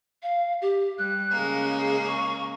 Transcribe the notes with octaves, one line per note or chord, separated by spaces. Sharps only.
F5
G4
G3 F#6
C#3 G#3 A#3
G#4
C#6